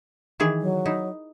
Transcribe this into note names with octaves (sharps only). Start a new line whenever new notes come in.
D#3 E3 G#4
F#3
D#4 E4